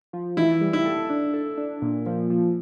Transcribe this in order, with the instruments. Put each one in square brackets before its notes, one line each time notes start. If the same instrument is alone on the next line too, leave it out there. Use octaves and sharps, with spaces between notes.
[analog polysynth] F3
[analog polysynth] E3 [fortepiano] E4
[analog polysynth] G3
[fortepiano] E4
[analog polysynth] A4
D4
A4
D4
A#2
F3
F3